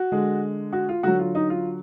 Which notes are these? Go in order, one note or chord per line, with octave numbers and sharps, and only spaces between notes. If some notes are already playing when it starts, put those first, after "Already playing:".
Already playing: F#4
D3 G#3
F#4
F4
D3 F#3 F#4
F4
D#4
F4